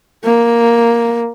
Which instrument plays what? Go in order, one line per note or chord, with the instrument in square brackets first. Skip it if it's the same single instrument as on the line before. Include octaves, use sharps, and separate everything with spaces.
[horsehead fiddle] A#3